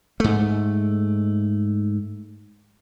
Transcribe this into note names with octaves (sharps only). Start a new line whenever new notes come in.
G#2 A3